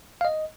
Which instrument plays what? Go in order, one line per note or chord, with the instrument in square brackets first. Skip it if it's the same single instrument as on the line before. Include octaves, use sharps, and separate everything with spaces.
[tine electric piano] F5
D#5